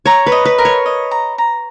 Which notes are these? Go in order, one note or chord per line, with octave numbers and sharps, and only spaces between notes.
C#5 A#5
B4
D#5
B4
A#4
C#5
D#5
A#5
A#5